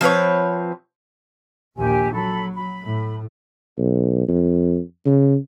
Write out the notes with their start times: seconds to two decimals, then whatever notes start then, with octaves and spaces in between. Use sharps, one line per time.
0.01 F3 C4 B4 C#5
1.76 A#1 D#2 G4 G#5
2.13 F#3 A4 B5
2.54 B5
2.84 A2
3.78 B1
4.28 F2
5.06 C#3